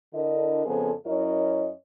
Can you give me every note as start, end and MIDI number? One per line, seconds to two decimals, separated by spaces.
0.14 0.65 50
0.14 0.65 62
0.14 0.65 64
0.14 0.65 69
0.14 0.65 70
0.14 0.65 75
0.65 0.91 41
0.65 0.91 49
0.65 0.91 59
0.65 0.91 68
0.65 0.91 69
0.65 0.91 72
1.06 1.71 42
1.06 1.71 61
1.06 1.71 64
1.06 1.71 70
1.06 1.71 73
1.06 1.71 75